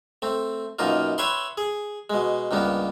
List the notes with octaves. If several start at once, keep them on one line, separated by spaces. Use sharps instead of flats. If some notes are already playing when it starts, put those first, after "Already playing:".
A3 C4
F#2 B2 A#3 D#4 F4
B4 C#5 E5 G5 B5 C6
G#4
B2 G#3
C#2 G2 A#3 B3